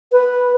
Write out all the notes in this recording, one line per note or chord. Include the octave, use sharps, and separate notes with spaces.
B4